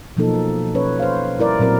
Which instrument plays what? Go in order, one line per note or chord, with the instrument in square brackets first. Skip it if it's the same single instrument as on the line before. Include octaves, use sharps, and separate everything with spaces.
[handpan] B2 F3 F#3 A#3 D#4 A4
C#4 B4 C#5
C5 F5
G3 E4 A#4 D5
A#2 F#3 C4 A#4